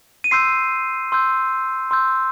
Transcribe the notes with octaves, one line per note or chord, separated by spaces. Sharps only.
D#7
C6 E6 G6 C7
C6 E6 G6
C6 E6 G6